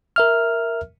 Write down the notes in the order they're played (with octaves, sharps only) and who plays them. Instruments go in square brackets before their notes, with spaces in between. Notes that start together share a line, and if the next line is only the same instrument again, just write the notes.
[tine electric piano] A#4 E5 F6